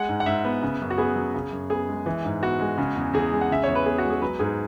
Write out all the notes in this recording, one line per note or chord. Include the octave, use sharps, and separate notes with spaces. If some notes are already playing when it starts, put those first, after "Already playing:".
Already playing: G#3 F#5
G#2
F#5
G#2 E5
B3
C#3
F#2
F#4
B3 G#4
F#3
C#3
F#2
B3 G#4
G#3
E3
G#2
B3 F#4
G#3
C#3
E2
E2 G#4
G#3
F#5
C#3 E5
E2 C#5
B4
B3 G#4
F#4
G#3
G#4
F#3 B4
G#2 G#4